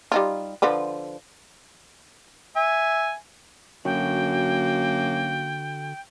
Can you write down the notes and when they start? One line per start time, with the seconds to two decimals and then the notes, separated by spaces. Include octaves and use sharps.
0.12 G3 D#4 F4
0.62 D3 F3 B4
2.56 E5 G#5
3.85 F#2 D3 A#3 F#4 G5